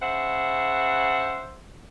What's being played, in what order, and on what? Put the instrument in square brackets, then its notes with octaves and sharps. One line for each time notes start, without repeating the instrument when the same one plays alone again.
[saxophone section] C#3 C5 E5 F#5